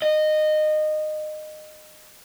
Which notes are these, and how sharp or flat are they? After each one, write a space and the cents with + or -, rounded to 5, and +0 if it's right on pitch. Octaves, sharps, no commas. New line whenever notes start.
D#5 -20